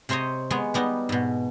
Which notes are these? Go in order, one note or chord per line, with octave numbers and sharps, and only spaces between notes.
C3 C4 C5 C#5 D#5
G#3 B3 C#5
G3 B3 D#4
G#2 B2